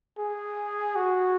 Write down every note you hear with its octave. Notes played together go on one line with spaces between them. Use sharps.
G#4
F#4